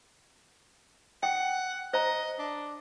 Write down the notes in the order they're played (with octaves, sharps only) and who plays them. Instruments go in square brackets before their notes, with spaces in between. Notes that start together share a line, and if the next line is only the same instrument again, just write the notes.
[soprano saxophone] F#5 [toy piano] G5
[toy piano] C5 A#5 [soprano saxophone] D#5
[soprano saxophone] D4